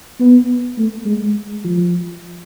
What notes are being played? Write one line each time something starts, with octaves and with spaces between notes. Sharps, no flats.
B3
A3
G#3
F3